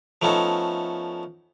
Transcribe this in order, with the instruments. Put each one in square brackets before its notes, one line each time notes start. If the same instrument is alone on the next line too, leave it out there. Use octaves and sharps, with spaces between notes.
[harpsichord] F3 A3 B3 C#4 D#4 A4